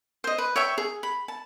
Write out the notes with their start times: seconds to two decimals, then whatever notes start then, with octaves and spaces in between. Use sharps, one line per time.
0.24 C5 D#5
0.38 B4
0.56 C#5 E5 G5 C#6
0.78 G#4
1.03 B5
1.28 A5